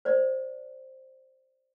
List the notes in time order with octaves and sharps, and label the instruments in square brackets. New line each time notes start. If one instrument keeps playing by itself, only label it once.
[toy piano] C5 D5